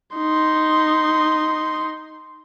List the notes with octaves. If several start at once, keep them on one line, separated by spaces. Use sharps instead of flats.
D#4 C6